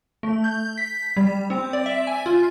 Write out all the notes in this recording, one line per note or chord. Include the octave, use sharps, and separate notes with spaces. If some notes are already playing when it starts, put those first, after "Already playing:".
A3
G6
B6
G3
C4
D5
E5
G#5
F4